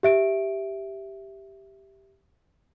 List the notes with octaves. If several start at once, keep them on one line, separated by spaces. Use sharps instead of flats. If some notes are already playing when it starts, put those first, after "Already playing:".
G4 E5 D7